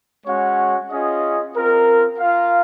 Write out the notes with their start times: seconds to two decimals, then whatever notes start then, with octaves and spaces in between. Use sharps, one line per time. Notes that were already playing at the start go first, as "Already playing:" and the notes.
0.26 G#3 C#4 F#4 C#5 F#5
0.90 C#4 F4 G#4 D#5
1.55 C4 F4 A#4
2.19 F4 A#4 F5